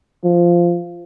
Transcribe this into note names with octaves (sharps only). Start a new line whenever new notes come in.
F3